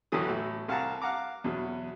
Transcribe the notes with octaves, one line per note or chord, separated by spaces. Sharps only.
A1 E2 D3 E3 F#3 D#6
A2
C2 F5 F#5 A5 A#5
F5 F#5 A#5 D6
E2 B2 F#3